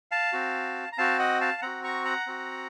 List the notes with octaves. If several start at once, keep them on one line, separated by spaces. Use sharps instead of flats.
F5 A5
C4 F#4
A#5
C4 F#4 F5 A5
D#5 F#5
F5 A5
C4 F#4 F#5 A#5
A#5 C#6
F#5 A#5
C4 F#4